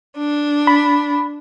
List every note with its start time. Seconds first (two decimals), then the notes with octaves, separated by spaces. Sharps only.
0.18 D4
0.67 B5